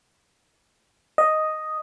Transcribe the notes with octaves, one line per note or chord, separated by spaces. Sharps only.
D#5